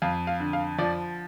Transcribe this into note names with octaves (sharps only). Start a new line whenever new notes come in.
F2 F5
F5
D3
F5
F3 D5